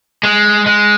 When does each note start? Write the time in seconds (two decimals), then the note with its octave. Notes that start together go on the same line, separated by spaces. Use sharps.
0.23 G#3
0.66 G#3